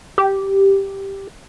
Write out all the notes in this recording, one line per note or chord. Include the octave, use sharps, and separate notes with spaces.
G4